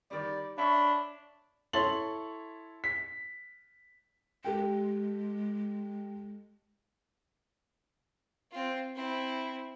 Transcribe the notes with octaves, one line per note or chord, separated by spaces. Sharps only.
D#3 G3 D5
D4 C#5 E5 B5 C#6
E4 A4 C#5 C6 A6 F#7
B6
G#3 G4 A4 G5
C4 F4
C4 E4